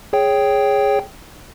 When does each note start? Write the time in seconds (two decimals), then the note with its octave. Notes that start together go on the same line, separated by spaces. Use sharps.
0.13 G#4 C#5 G5